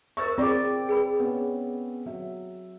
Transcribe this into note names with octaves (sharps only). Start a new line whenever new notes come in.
A#4 C5 E5 C#6 E6 A6
C4 F4 G#4 D5 G5 D6
G#4 B4 B5
B3 C#4
F#3 E5